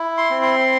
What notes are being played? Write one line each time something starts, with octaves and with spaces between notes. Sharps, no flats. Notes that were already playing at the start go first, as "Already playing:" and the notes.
Already playing: E4
C6
C4
C6